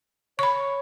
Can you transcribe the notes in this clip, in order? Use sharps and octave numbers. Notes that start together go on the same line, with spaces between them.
C#5 B5 C#6